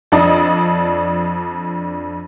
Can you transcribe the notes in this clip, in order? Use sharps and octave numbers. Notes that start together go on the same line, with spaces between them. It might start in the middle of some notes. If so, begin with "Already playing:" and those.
F2 D4 D#5